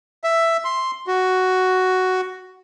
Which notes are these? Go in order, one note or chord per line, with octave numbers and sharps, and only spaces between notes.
E5
C6
F#4